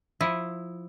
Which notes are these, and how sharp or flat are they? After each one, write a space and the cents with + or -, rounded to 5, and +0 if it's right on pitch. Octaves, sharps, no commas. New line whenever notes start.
F3 +10 E4 +0